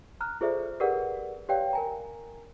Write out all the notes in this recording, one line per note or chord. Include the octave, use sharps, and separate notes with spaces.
A#5 F6 F#6
F4 G#4 A4 C5 D5 E5
G4 G#4 A#4 B4 D5 F#5
G4 B4 C#5 D5 F5 G5
A#4 G#5 A#5